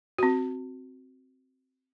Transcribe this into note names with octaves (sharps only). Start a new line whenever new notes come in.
C4 F#4